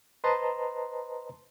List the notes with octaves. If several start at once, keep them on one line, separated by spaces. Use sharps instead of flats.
B4 C5 D#5 A5 A#5 C6